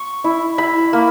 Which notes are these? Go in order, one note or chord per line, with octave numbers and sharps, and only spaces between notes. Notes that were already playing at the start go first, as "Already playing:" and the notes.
Already playing: C#6
E4
E4 B5
A#3